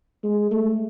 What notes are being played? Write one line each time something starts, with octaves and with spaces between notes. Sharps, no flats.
G#3
A3